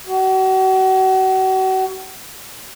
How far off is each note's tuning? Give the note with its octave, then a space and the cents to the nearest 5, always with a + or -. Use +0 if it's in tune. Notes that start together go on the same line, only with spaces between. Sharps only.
F#4 +35